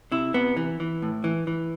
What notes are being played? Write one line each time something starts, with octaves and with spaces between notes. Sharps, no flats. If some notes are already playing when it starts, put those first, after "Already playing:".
C3 E4
C3 B3
E3
E3
A2
E3
E3